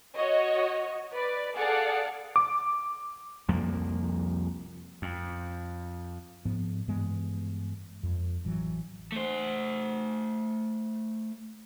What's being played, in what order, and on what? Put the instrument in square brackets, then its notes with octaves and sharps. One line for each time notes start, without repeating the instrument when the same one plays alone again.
[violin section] F#4 C#5 D#5
B4 D5
G#4 A4 D5 F5 F#5
[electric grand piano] D6
[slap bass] C2 F2 F3 A#3
F2
[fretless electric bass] G#2 F3 B3
G2 E3 G#3 B3
F2
A1 E3 F#3
[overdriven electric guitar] A3 C5